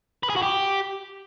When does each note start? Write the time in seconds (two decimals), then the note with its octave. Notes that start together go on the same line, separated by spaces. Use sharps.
0.23 B4
0.30 G#4
0.36 F#4
0.43 G4